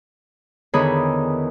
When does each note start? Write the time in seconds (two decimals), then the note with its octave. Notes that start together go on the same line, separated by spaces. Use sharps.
0.74 E2 D3 D#3 G#4 C#5 B5